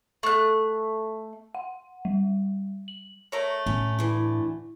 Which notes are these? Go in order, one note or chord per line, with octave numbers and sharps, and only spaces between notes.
A3 F#6
F#5
G3
F#7
A3 A#4 C#5
A2 C#4 A#5
D2 E3